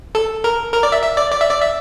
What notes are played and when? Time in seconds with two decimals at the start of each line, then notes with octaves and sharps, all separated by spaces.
0.15 A4
0.44 A#4
0.73 A#4
0.83 D5
0.92 E5
1.02 E5
1.17 D5
1.32 D5
1.41 E5
1.51 D5
1.61 E5